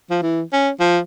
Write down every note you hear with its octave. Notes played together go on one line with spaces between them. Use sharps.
F3
E3
C#4
F3